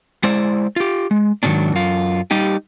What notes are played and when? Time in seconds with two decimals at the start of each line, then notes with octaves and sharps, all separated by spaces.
0.23 G#3 E4 C5 D5
0.76 F4 G4
1.11 G#3
1.43 G#2 D#3 E3 F#3 C#4 D4
1.73 F#2 F4
2.31 G3 D#4 G4